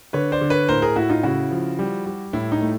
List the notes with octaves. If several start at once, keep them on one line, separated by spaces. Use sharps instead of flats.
D3 B4 C#5
C5 D5
D3
B4 C#5
A2 A#4 C5
G#4 A#4
A2 E4 F#4
D#4 F4
C#3 E4 F#4
F3
G3
G3
A2 E4
D#4
A3